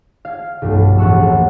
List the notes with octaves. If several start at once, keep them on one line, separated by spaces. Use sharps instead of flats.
F5 G#6
B1 G2 F3 A3
E1 A1 F#5 C#6 E6
A#3